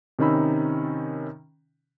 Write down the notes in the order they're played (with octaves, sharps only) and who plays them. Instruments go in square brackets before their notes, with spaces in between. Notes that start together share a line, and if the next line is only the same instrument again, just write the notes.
[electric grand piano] C3 D#3 C#4 D#4 B5 E6